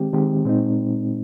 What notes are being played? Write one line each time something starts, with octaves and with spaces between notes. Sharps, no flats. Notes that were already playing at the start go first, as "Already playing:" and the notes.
Already playing: D#3 G#3 C4 G4
D#3 G#3 C4 G4
A#2 G#3 C4 D#4